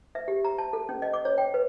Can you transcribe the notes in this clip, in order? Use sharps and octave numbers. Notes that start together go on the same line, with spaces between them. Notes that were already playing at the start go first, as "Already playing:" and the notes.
E5
G4
A#5
A5
A4
C#4
D#5
D6
C#5
G5
B4